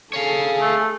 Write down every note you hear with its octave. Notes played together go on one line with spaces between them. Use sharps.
G#4 A4 C#5 F5
A3